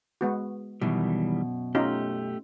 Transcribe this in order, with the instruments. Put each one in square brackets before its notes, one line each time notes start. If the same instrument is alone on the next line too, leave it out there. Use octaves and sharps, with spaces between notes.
[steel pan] G#3 B3 F#4
[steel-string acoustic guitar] F#2 B2 [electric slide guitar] D#3 E3 G3
[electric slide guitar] A3 G4 [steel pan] C#4 D#4 F4